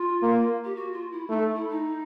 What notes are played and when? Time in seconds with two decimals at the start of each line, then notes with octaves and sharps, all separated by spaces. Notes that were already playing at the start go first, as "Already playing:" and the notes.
Already playing: F4
0.22 A#3
0.65 G4
0.76 F#4
0.93 F4
1.12 E4
1.29 A3 D#4
1.56 E4
1.69 D#4